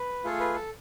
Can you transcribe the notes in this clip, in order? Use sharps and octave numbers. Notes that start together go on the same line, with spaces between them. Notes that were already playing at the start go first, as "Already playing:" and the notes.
Already playing: B4
A3 F4 G#4 A4
B4
A4